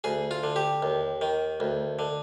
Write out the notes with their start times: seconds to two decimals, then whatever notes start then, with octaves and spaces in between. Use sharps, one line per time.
0.04 D2 G#4
0.31 F4
0.43 D3
0.56 G4
0.82 D#2
1.21 D#3
1.60 D2
1.99 D3